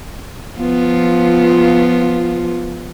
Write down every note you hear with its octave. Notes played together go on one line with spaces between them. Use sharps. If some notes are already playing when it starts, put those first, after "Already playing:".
F3 B3 F4